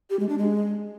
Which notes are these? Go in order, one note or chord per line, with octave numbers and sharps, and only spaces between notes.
G4
G#3
D4
G#3